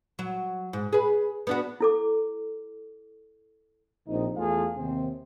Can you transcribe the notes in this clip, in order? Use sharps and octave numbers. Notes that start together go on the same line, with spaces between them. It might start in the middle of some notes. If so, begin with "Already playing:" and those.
F#3
G#2
G#4 B4
B3 D4 F#4
E4 A4 D6
A#1 C3 D#4
E2 A3 F4 G#4 A4 F5
D#2 C3 C4